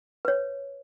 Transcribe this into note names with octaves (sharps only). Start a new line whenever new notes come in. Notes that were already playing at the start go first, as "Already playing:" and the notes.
B4 C#5